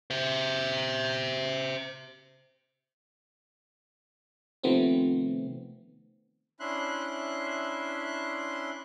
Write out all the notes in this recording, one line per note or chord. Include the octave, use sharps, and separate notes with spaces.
C5 E5
C3 D#3 F3 A3 B3 C4
C#4 D4 E4 E5 C6 F#6